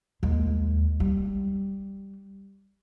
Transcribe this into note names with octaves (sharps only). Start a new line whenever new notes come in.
D#2 G#3
G3